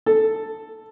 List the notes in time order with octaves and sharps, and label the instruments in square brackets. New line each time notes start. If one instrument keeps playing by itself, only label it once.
[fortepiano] A4